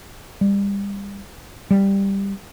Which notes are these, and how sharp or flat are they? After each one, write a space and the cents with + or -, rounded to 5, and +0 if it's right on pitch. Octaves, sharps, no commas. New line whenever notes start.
G3 +30
G3 +5